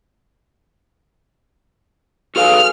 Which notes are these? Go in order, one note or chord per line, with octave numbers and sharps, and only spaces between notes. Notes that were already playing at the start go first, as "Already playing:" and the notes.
F#4 G#4 A4 B4 F5 F6